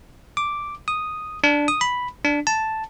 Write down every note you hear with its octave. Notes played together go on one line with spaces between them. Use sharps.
D6
D#6
D4
D#6
B5
D4
A5